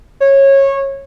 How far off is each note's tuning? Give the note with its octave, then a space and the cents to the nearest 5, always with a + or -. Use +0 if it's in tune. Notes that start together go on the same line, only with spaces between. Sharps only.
C#5 -20